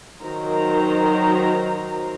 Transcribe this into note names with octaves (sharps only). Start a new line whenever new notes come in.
D#3 F#3 A#4 C5 A#5